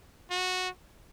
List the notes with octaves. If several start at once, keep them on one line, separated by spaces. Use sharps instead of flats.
F#4